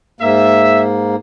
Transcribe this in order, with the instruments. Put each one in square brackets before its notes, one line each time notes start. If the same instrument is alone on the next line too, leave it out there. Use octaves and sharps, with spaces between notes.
[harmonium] G#2 A#3 [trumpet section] E5